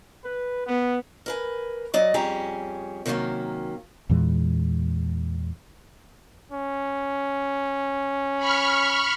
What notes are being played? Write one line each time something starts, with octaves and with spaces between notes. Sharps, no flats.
B4
B3
A#4 B4 G#5
F#3 D5 D#5
F2 G3 C#4 G#4 A#5
C3 D#3 F#3 G3 A#3 C#4
E2 A#2 E3 G#3
C#4
B5 C#6 F6